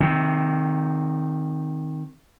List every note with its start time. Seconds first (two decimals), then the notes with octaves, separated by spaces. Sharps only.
0.01 C3 D#3